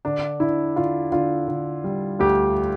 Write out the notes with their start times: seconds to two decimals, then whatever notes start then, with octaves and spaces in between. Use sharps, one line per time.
0.05 D3 D4
0.40 D3 E4
0.76 D3 F4
1.12 D3 F4
1.48 D3
1.84 G3
2.19 D2 G4